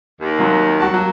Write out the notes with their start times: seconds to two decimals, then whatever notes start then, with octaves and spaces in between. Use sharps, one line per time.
0.21 D#2
0.39 C3 F#3 A#3
0.80 F#3 F#4 A5
0.94 F#3 A#3